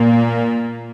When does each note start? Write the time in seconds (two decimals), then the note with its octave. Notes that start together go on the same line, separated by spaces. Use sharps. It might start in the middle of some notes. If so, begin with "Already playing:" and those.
Already playing: A#2 A#3